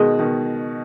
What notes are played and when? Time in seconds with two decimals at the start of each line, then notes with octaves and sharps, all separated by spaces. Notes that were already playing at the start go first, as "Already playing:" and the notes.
Already playing: B2 D#3 G#3
0.19 B2 D#3